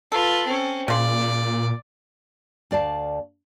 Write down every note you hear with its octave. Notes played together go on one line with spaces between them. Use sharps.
F4 A4 B4
C4 C#4
A#2 C#3 D5 C6
D2 D5 F5 A5